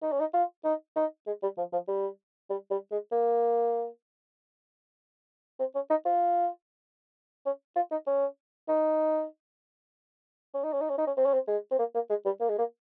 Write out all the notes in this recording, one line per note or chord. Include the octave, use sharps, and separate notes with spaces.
D#4
C#4
D#4
F4
D#4
D#4
G#3
G3
F3
F3
G3
G3
G3
G#3
A#3
C4
C#4
D#4
F4
C#4
F4
D#4
C#4
D#4
C#4
D#4
C#4
D#4
C#4
D#4
C#4
C4
C#4
C4
G#3
C4
A#3
A#3
G#3
G3
A#3
G#3
A#3